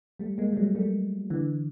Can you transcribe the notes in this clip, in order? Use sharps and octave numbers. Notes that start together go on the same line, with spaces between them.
G3 A3
G#3 A#3
G3
F#3 G#3
G3 A3
D3 E3